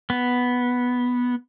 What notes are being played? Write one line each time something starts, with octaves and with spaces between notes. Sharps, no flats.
B3